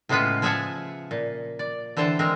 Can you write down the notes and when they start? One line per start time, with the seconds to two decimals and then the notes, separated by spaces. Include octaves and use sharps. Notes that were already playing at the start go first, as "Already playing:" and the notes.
0.09 A2 C#3 G#3 B3 F4 B4
0.42 F3 G#4 E5 F#5 G#5 A5
1.11 A#2
1.59 D5
1.97 D3 E3 C5 G5 A5
2.19 G#3 C4 A#4